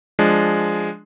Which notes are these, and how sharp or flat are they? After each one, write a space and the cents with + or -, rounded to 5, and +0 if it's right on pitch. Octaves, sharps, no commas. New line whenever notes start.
F3 +0 G#3 +0 D4 +0